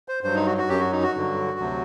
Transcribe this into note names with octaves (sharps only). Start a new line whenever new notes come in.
C5
G2 F#3 C5
D#4
F#4
F#4
F#2 F#3 G4
F#4
D#4
F#4
G2 D3 F#3
D2 C3 F#3